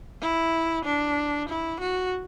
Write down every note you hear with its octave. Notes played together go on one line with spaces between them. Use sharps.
E4
D4
E4
F#4